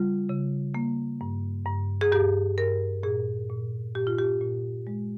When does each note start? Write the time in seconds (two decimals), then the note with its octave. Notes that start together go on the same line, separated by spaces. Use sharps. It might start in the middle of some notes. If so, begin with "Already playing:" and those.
Already playing: C#3 G3 F4
0.29 C#3
0.75 A#3
1.21 G2
1.66 G2
2.01 G#4
2.12 G2 G4
2.58 G2 A#4
3.03 A#2 G#4
3.50 A#2
3.95 A#2 G4
4.07 F4
4.18 G4
4.41 A#2
4.87 G#3